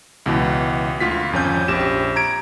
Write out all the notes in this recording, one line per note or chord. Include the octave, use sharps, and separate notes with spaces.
C#2 B2 E3
D2 F4 B6
G#1 F2 C#4 G6
A#1 G4 E7
A#5 G#6 D7